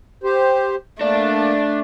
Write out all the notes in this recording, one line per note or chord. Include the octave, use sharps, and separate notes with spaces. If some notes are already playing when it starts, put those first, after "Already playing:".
G4 C5
A3 A#3 D4